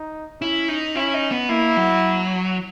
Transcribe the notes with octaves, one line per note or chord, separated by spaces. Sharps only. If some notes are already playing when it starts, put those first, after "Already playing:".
Already playing: D#4
C#4 E4
D#4
C#4 E4
D#4
B3
A#3 E4
F#3